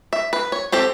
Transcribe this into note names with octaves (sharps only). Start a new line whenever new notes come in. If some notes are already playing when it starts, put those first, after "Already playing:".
E5
B4
C#5
C4 G4 A4